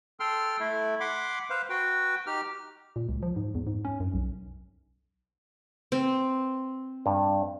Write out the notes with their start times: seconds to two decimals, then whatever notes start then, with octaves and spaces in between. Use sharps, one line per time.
0.20 A4 G5 C6 F6
0.60 A3 E4
1.00 F#5 B5 C6 D6
1.50 B4 C5 F5
1.70 F#4 B4 G5
2.26 D#4 G4 F6
2.96 A#2
3.09 C#2
3.23 F3
3.36 G#2
3.55 E2
3.67 G#2
3.85 C#4
4.00 F#2
4.14 B1
5.92 C4
7.06 G2